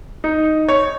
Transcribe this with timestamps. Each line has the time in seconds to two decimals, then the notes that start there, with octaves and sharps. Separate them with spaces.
0.24 D#4
0.68 C#5